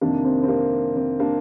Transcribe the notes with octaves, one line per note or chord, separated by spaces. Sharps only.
F2 C3 D#3 A#3 D4
C4
C4
A#3
C4
A#3 D4